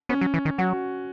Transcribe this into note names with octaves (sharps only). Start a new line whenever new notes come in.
B3 C#4
F#3
E3
D#3
F#3 F#4